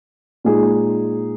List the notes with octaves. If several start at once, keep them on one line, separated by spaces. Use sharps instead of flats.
A#2 G#3 D#4 G#4